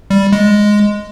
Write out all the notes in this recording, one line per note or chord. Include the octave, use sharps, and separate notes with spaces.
G3
G#3